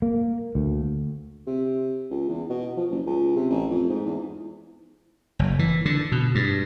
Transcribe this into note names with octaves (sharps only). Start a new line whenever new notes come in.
A#3
D2
C3
C#2
E2
B2
F3
F#1
C#2
C3
A1
F2
G#2
E2
F#1
E3
D3
B2
G2